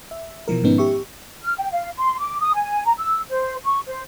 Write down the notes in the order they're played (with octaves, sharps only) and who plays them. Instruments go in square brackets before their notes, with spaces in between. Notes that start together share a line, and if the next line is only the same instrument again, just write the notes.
[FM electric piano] E5
B2 E3 F3 A#4
G#2 D#3 F3 B3 C#4 D#4
G4 E5 C#6
[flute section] F6
G5
F5
C6
D6
D#6
G#5
A#5
E6
C5
C#6
C5